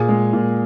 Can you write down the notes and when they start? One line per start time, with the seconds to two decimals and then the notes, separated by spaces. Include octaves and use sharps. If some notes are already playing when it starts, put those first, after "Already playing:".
Already playing: A#2 G#4
0.09 G#3
0.33 A#2